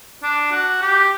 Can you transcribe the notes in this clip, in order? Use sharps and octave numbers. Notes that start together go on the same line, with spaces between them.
D4
F#4
G4